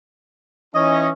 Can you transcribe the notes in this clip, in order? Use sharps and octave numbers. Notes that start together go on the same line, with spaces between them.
E3 C#4 D#4 C#5 D#5